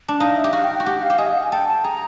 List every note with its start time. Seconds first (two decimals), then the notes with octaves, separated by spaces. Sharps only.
0.08 D4
0.20 D#4 F5
0.37 E5
0.44 G4
0.53 F#4 F5
0.64 G5
0.75 G5
0.80 F#4
0.86 G4 F#5
1.02 F5
1.10 G4
1.18 G#4 D#5
1.27 F5
1.35 F#5
1.43 G#5
1.51 A4 G5
1.68 A5
1.84 G#4 A#5